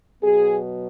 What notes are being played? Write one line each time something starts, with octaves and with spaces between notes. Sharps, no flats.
B2 F#3 B3 G#4